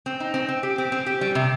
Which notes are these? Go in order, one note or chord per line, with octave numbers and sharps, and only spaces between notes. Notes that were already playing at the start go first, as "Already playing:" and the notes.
C4
D#4
C4
C4
G4
C4
C4
G4
G3
C3